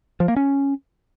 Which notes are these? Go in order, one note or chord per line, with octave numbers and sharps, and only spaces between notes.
F3
A#3
C#4